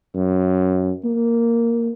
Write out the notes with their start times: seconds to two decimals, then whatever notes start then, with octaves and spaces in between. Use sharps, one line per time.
0.15 F#2
1.04 A#3